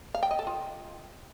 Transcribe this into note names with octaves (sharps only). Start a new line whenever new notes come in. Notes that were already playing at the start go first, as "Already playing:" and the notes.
F5
G5
D#5
A4
F4